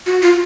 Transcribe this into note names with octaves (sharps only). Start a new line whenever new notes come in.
F#4
F4